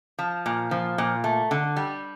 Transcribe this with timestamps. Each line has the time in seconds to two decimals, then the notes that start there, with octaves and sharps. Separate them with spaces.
0.19 F3
0.46 A#2
0.71 F3
0.98 A#2
1.24 A3
1.51 D3
1.76 G3